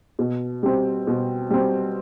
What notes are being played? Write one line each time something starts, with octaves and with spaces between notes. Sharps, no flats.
B2
G3 C4
B2
G3 C4